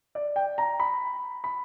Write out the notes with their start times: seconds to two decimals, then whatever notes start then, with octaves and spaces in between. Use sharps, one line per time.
0.15 D5
0.36 G5
0.58 A#5
0.80 B5
1.44 B5